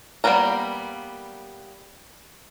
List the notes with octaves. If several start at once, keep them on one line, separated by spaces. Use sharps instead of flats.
G3 A#3 B3 C#4 A#5